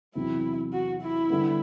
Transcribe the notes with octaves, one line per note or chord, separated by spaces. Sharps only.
E2 C3 F#3 C4 E4
F#4
E4
D3 G3 B3